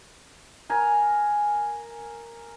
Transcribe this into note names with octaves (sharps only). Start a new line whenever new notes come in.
A#4 G#5 A#5